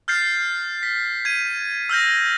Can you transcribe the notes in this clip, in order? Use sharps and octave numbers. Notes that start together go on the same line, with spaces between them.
F6 G6 A6 C7
B6
G#6 D#7
E6 F6 G6 A#6